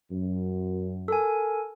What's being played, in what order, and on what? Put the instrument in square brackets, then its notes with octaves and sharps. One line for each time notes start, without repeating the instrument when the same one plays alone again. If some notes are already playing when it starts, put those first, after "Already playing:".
[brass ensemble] F#2
[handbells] A4 A#4 G#5